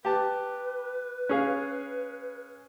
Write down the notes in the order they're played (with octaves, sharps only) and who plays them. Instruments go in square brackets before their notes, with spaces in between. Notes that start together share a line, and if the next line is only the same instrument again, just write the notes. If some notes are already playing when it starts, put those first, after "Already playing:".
[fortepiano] G4 A5 [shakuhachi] B4
[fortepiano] C#4 G#4 F5